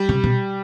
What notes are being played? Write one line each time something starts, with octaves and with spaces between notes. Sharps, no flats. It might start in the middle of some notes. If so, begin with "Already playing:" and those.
Already playing: G3
C3
B2